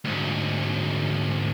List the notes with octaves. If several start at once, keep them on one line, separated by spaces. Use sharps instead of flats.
D2 G#2